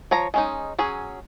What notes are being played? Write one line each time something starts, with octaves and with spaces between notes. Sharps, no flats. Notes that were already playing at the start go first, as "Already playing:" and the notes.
F3 C#5 A#5
G#3 C#4 D#4
F#3 C#4 G#4